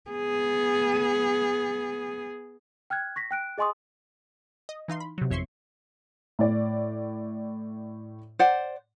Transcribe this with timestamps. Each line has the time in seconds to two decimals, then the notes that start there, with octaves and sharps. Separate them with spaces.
0.11 B3 G#4
2.90 G5 F6 F#6 G#6
3.16 C#6 A#6 B6
3.31 G5 F#6 D7
3.58 G#4 D#5 G#5 C6 C#6 D#6
4.69 D#5
4.88 E3 D#4 F5 C6
5.00 B5
5.18 C3 F#3
5.30 G#1 F2 C#5 E5 C6 C#6
6.39 A2 D5
8.39 C5 D5 F#5